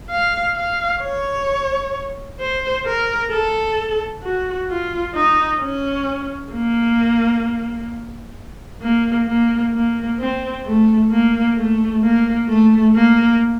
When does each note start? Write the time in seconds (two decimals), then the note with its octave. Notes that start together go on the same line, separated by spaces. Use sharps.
0.10 F5
0.56 F5
1.02 C#5
2.40 C5
2.86 A#4
3.31 A4
4.23 F#4
4.69 F4
5.15 D#4
5.61 C#4
6.53 A#3
8.82 A#3
9.28 A#3
9.74 A#3
10.20 C4
10.66 A3
11.12 A#3
11.58 A3
12.03 A#3
12.49 A3
12.96 A#3